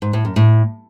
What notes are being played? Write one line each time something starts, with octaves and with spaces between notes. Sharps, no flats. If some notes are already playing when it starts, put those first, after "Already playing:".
G#2
A2
F#2
A2